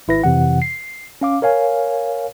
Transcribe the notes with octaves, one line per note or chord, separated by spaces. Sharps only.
G#1 E4 B4 A#6
F2 C3 E3 F#5
C7
C#4 F5 D6
A#4 C#5 F5 G#5